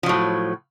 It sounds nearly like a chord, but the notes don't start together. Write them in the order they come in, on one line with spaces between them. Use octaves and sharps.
F3 F#3 A2